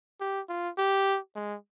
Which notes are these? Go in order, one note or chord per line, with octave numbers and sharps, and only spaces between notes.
G4
F4
G4
G#3